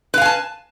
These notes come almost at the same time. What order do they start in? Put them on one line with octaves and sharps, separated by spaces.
B4 F5 G#5 A5